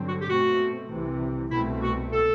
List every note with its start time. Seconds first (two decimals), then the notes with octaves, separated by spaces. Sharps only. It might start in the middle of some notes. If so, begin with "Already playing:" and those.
Already playing: G2 D3 F#3 C4
0.08 F#4
0.21 G4
0.30 B2 A3 C4 F#4
0.90 C2 C3 E3
1.51 C2 B2 A3 C4 E4
1.82 F#4
2.11 A4